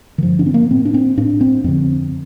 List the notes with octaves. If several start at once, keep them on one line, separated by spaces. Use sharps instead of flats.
D#3
G2 D3 F3
D4
C4
A#3
A2 C4
D4
C4
A2 D4
C4
F2 D3 C4